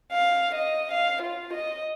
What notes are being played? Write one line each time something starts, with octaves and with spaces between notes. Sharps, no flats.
F5
D#5
F5
F4
D#5